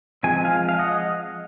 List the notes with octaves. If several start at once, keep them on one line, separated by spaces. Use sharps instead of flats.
F3 G#3 C4 G#5
F5 G#5
F5
D#5 F#5